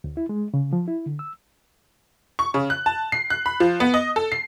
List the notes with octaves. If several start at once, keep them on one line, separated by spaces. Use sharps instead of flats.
D2
E4
G#3
C#3
F3
E4
D3
E6
C#6
C#3
F#6
A5
C7
F#6
B5
F3
B3
D#5
A4
C7